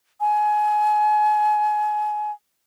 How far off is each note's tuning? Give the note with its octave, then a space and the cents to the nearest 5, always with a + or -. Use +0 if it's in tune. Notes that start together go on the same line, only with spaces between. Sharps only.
G#5 +25